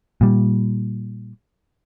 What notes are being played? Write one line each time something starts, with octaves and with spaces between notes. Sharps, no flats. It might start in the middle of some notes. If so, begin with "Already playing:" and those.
A#2 G3